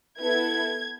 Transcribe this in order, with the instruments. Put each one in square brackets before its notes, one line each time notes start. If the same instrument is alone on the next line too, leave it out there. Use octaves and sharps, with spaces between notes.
[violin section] B3 E4 A4 G#6